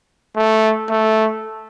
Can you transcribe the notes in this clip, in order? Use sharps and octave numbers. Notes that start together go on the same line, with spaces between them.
A3
A3